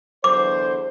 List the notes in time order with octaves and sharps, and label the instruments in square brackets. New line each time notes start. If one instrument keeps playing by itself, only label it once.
[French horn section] E2 D3 C5 [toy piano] D6